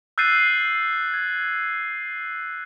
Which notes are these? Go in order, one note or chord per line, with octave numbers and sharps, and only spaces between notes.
E6 F#6 G6 A6 C7 D#7
G#6